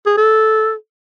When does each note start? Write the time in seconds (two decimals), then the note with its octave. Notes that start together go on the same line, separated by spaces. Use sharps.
0.06 G#4
0.17 A4